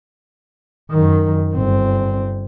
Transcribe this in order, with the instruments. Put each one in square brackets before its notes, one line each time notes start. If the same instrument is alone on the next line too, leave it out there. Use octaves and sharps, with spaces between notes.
[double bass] F#2 D#3
G1 C4